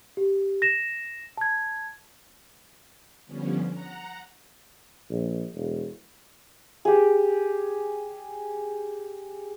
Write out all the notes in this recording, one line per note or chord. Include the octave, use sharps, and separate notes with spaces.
G4
A#6 E7
A5 G#6
D3 F3 G3 B3 C#4
F#5 A#5
A#1
E1
G4 G#4